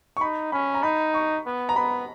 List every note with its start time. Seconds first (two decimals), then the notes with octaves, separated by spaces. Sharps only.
0.17 C#6
0.21 D#4 B5
0.52 C#4 B5
0.74 A#5
0.83 D#4 B5
1.14 C#6
1.46 B3
1.69 A#5
1.76 B3 B5